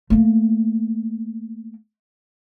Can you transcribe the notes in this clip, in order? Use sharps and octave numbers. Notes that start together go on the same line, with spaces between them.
A3 A#3